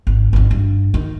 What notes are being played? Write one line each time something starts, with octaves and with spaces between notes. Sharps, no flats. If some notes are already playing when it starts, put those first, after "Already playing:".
G#1
G#1 F2
G2
D#3